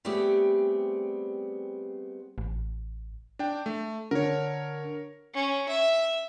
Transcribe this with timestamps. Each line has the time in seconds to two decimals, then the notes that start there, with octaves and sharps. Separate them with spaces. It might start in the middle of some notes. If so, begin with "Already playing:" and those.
0.05 G3 A3 B3 C4 G4 G#4
2.38 A1
3.39 D4 G5
3.66 A3
4.11 D3 A#4 C#5
5.34 C#4
5.69 E5